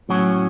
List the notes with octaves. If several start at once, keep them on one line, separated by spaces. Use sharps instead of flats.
A2 F#3 C#4 F#4